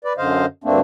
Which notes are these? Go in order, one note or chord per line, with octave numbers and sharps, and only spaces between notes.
B4 D5
F#2 D3 C5 D#5 F5
D2 G2 A3 A#3 C4 D4